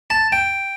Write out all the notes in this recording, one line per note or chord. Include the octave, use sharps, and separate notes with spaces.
A5
G5